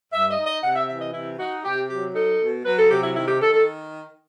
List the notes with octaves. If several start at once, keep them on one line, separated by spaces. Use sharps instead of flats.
G2 E5
D#5
D#4
D#5
C3 F#5
E5
E3 E5
D#5
C3 E4
D#4 F#4
C3 G4
F#3 G4
D#4 A4
B2
F#3 B4
A4
C3 G4
E4
D#3 E4
G4
D#3 A4
A4